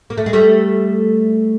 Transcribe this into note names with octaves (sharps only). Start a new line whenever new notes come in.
A#3
A3
G#3
G3 A3